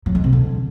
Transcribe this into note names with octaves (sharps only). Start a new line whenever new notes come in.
F#3
G#3
C3
D3